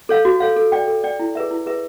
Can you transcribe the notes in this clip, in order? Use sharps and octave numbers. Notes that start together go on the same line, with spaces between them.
A4 C#5 F5
F#4
A4 C#5 F5
A4
D5 G5
A4
D5 G5
E4
G#4 B4 E5
E4
G#4 B4 E5